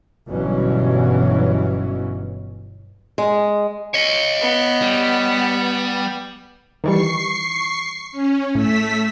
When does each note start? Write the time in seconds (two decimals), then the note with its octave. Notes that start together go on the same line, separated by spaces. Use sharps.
0.27 G1 B2 E3 F#3 C#4
3.18 G#3
3.94 C#5 D#5
4.41 B3
4.82 G3
6.84 D#3 E3 G3 C#6 C7
8.12 C#4
8.55 A2 A3 E6 B6